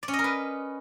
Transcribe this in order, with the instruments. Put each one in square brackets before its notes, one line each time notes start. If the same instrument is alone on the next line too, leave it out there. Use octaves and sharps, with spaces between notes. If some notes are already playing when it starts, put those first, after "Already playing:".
[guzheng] D5
C#4
D#5
A#4
B4